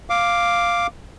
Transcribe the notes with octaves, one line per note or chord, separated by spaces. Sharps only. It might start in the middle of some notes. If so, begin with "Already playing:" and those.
F5 D6